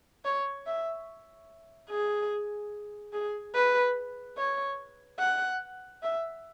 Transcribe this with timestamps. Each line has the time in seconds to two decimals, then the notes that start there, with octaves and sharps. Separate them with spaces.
0.25 C#5
0.66 E5
1.90 G#4
3.13 G#4
3.55 B4
4.38 C#5
5.19 F#5
6.03 E5